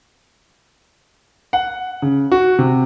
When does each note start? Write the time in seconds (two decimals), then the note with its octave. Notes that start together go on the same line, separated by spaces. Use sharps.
1.53 F#5
2.02 C#3
2.32 F#4
2.59 C3